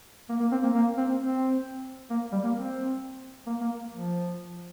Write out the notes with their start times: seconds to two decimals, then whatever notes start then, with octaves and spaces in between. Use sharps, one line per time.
0.29 A#3
0.40 A#3
0.52 C4
0.63 A#3
0.74 A#3
0.97 C4
1.20 C4
2.10 A#3
2.32 G3
2.44 A#3
2.56 C4
3.47 A#3
3.61 A#3
3.92 F3